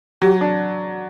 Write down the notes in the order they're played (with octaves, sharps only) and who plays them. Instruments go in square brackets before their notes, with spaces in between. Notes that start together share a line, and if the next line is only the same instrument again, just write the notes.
[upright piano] F#3 [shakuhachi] G4
[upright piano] D4